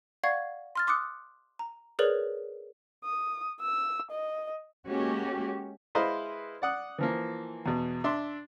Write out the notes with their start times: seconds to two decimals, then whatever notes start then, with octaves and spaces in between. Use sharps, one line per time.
0.24 D5 F5 F#5 C#6 G#6
0.75 C6 F6 A6
0.87 C6 D6 D#6 F#6 C#7
1.59 A#5
1.99 G#4 A#4 B4 C#5 D5 F#7
3.05 D#6
3.60 E6
4.10 D#5
4.87 G#3 A#3 C#4 F#4 G4
5.95 G#3 E4 B4 C5 D#5 F5
6.62 D5 F#5 D#6
6.98 E3 F3 A#3
7.66 E2 B2
8.04 D4 E5 C6